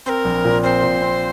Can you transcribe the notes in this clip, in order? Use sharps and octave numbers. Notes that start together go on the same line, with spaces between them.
C4 A#4 C5
A#1
A#2
C4 C5
A#2
C4